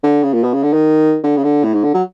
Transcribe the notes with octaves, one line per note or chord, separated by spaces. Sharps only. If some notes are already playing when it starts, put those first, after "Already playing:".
D3
C#3
A#2
B2
C#3
D3
D#3
D3
C#3
D3
A2
G#2
D3
F#3